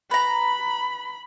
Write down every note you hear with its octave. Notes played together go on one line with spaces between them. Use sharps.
B4 A#5 B5